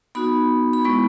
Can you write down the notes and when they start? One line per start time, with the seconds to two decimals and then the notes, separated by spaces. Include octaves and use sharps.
0.15 B3 D#4 F#4 B5
0.73 B5
0.85 G#3 B3 E4 C#6